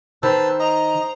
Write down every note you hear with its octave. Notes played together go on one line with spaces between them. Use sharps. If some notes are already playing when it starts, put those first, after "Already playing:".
D#3 B4 C5 A5 E6
D#5 A#5